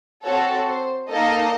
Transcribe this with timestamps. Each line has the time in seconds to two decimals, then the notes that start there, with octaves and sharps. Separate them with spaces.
0.23 C4 F#4 A4 C#5
0.67 C5
1.09 A#3 D#4 A4 D#5